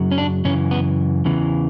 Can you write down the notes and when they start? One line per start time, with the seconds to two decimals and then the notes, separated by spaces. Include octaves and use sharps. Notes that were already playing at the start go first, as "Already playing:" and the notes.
Already playing: F#2 C#3 F#3
0.11 C#4
0.18 D4
0.44 F#2 C#3 E3 C#4
0.71 B3
1.25 E2 C#3 E3